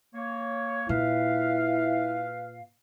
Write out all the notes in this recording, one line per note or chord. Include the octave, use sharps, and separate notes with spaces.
A#3 C#5
A#2 E4 B4 F5